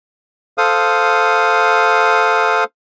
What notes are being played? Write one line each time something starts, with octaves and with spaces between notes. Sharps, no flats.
A4 C5 F5 D#6